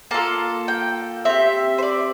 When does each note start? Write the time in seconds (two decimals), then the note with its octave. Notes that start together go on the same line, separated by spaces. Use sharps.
0.11 A#3 F4 A4 A5
0.68 G5
1.25 C4 G4 E5
1.78 C5
1.83 D5